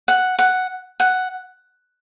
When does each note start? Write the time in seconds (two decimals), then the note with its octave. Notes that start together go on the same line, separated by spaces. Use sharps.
0.08 F#5
0.39 F#5
1.00 F#5